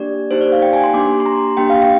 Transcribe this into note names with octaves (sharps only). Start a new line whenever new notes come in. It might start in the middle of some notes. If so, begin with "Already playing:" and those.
Already playing: A#3 D4 G4 D5
A#3 D#4 G4 C5
D5
F5
G5
G#5
C6
A#3 D4 G4 D6
C6
A#5
A#3 D4 G4 G5
F5
G5